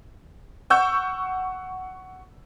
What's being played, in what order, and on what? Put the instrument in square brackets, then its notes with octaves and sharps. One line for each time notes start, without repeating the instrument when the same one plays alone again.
[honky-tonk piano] F#5 C#6 E6 G6